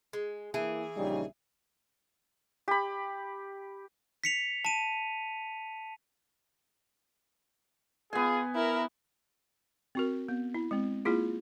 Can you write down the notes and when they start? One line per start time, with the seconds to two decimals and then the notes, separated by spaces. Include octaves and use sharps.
0.13 G#3
0.54 E3 A#3 E4 G#4
0.97 A#1 C#3 G3 D#4
2.68 G4 B5
4.24 B6 C#7 F7
4.65 A5 D#7
8.13 B3 F4 G#4 G#5
8.55 E4 A#4
9.95 C4 F#4 A#4
10.28 B3
10.54 E4
10.71 G#3 C4
11.05 A#3 E4 F4 G#4